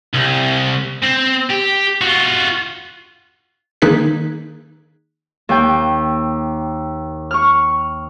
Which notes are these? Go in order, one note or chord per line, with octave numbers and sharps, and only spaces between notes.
C2
C4
G4
F4 F#4
D#3 A#3 D#4 G#4 F#6 B6
D#2 G5
C#6 F6